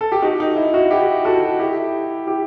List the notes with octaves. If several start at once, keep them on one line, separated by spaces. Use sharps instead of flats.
A4
G4
D#4 F#4
D#4
E4
D#4 F#4
E4 G4
F#4 A4
E4 G4
E4 G4